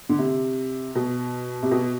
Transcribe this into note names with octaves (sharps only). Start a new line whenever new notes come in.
D3
C3
B2
C3
B2